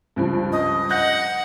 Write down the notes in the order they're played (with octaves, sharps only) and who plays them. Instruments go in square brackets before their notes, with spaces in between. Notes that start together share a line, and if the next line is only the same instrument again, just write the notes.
[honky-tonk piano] C#2 G2 F3
[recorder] D#5
[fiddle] F#5 [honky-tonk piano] F#6 G6 A#6